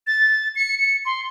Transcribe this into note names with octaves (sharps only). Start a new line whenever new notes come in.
A6
C#7
C#7
C6